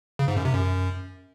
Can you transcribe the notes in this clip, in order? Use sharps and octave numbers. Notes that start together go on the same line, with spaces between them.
C#3
G#2
F#2
C3
F#2